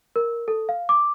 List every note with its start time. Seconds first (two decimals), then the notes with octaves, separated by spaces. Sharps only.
0.16 A#4
0.48 A4
0.69 F5
0.89 D6